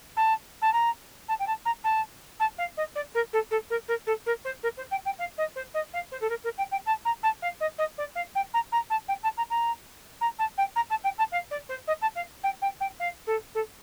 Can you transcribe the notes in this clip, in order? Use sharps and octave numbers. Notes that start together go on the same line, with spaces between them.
A5
A5
A#5
A5
G5
A5
A#5
A5
A5
F5
D#5
D5
A#4
A4
A4
A#4
A#4
A4
A#4
C5
A#4
C5
G5
G5
F5
D#5
C5
D#5
F5
C5
A4
A#4
A#4
G5
G5
A5
A#5
A5
F5
D#5
D#5
D5
F5
G5
A#5
A#5
A5
G5
A5
A#5
A#5
A#5
A5
G5
A#5
A5
G5
A5
F5
D5
C5
D#5
A5
F5
G5
G5
G5
F5
A4
A4